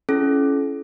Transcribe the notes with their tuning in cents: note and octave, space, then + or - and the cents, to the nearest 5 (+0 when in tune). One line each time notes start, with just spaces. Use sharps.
C#4 +0 E4 +25 A4 -40